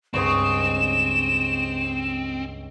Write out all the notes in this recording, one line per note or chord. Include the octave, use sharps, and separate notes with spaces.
C#2 G2 C4 C#5 D#5 C#6 E7